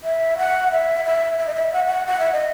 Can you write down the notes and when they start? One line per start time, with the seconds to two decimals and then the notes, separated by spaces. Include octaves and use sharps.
0.04 E5
0.38 F#5
0.72 E5
1.05 E5
1.39 E5
1.47 D#5
1.54 E5
1.73 F#5
1.87 F#5
2.07 F#5
2.20 E5
2.33 D#5